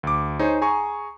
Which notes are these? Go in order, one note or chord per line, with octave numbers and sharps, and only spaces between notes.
D2 D6
D#4 G#4 C5 C#5
G#4 G#5 A#5 C#6